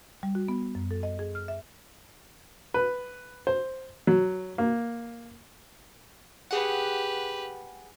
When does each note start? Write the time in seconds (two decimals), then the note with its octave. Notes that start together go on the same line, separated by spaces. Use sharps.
0.23 G3
0.35 F#4
0.48 B3
0.75 F#2
0.91 A4
1.03 D#5
1.19 G#4
1.35 F6
1.48 E5
2.74 B4
3.47 C5
4.07 F#3
4.58 A#3
6.51 G4 G#4 B4 F#5